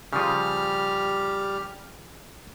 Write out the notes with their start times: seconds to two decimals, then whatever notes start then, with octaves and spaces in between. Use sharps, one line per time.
0.13 C#3 F3 G3 G4 F6